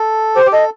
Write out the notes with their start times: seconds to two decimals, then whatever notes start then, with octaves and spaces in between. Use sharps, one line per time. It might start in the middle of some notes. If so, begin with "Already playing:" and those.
Already playing: A4
0.36 G4 C5
0.46 G4
0.52 A4 D#5